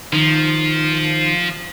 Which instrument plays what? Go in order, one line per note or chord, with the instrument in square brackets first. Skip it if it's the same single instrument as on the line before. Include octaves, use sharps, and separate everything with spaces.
[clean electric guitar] D#3 [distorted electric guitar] F3